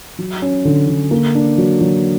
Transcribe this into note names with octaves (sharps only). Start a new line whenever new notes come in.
F#3
C#4
D3
D3
A#3
D4
F#3
F#3